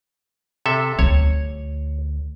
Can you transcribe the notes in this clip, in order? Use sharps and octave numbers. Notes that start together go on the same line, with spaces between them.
C3 A4 E5
D2 C#5